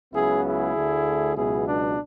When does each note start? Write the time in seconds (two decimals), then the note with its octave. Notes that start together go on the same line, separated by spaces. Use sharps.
0.13 C#2 C#3 F#3 B3 E4 G#4
0.45 E4 G#4
0.75 D2 D3 A3
1.36 C#2 B2 F#3 B3 E4 G#4
1.67 D4